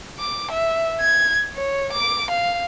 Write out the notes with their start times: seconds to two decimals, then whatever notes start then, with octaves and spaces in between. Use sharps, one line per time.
0.20 D6
0.51 E5
1.01 G#6
1.55 C#5
1.93 D6
2.31 F5